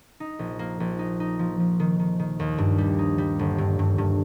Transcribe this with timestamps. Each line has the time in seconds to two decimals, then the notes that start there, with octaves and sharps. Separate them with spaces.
0.20 D#4
0.39 A#1
0.59 A#3
0.80 A#1
0.99 D#4
1.20 D#4
1.39 F3
1.60 F3
1.80 D#3
1.99 D#3
2.19 D#3
2.40 D#2
2.58 G2
2.78 G3
2.99 D#4
3.18 G3
3.39 G1
3.58 G2
3.79 G2
3.98 G2